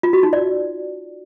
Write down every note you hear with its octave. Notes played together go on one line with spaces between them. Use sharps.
F4
F#4
D#4
D5